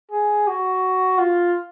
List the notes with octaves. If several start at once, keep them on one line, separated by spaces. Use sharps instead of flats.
G#4
F#4
F4